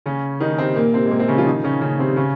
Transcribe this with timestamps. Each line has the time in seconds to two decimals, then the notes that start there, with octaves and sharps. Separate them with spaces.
0.06 C#3 C#4
0.40 D#3 D#4
0.58 C3 C4
0.76 A#2 A#3
0.93 C3 C4
1.06 G#3
1.11 A#2 A#3
1.19 C3 C4
1.28 C#3 C#4
1.38 F3 F4
1.46 D#3 D#4
1.64 C#3 C#4
1.81 C#3 C#4
1.99 C3 C4
2.16 C#3 C#4